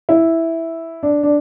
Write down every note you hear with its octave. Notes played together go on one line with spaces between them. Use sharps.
E4
D4
D4